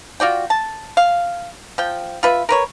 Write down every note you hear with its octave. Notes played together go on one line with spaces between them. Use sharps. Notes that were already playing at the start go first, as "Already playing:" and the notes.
F4 F#4 D5 G5
A5
F5
F3 G5
F4 B4 E5
A#4 B4 C#5